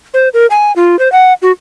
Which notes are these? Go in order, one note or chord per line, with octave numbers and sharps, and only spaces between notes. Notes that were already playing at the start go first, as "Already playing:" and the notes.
C5
A#4
G#5
F4
C5
F#5
F#4